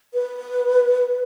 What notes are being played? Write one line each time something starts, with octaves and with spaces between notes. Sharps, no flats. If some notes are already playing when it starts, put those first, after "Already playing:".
B4